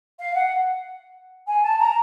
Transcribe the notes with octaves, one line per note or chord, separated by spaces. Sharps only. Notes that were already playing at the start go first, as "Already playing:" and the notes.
F5
F#5
G#5
A5
A#5